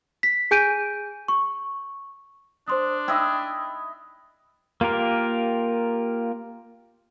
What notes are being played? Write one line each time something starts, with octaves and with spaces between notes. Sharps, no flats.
B6
G#4 G#5 G6 D7 D#7
C#6
D4 C5 C6 D#6
E4 D#5 G5 E6
A#3 F4 G4 A#4